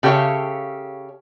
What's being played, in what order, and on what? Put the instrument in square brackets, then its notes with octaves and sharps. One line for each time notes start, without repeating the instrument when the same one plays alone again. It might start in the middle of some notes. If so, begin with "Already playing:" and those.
[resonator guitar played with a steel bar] C#3 G4 A4 C#5 E5 F5